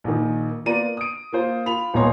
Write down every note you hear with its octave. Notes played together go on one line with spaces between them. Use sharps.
A#1 D#3
A#3 B3 F4 D5 A#5 D#7
D#6 D7
A#3 F4 C5
F4 B5 F7
D#1 B1 B3 C#5 A#5 C6